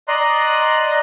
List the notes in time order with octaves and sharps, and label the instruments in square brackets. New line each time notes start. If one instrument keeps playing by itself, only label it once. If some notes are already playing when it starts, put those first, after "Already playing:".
[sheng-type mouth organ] D5 D#5 A#5 C6 F#6